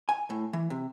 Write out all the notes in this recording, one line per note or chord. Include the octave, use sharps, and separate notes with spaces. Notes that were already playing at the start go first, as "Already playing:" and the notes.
G#5
A2
E3
C3